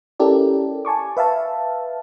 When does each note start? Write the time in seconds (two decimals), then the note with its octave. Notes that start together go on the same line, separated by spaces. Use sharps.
0.20 C#4 E4 G4 A4 A#4 D5
0.85 G#5 A5 C#6 D6
1.17 B4 E5 F5 A5